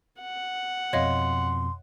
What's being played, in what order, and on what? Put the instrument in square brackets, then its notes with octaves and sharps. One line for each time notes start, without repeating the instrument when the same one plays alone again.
[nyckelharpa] F#5
[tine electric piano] F2 B2 [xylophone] C#5 D#5 F5 [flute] C6